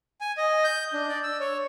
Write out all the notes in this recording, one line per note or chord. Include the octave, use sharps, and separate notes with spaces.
G#5
D#5
G6
D4
D5
E6
C#5